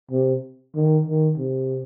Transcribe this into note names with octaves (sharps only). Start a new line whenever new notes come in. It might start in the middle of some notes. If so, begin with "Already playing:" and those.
C3
D#3
D#3
C3